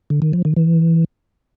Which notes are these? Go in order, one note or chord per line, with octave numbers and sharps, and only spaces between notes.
D3
D#3
F3
D#3
E3